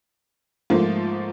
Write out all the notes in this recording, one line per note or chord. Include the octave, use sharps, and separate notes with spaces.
G#2 F3 A3 A#3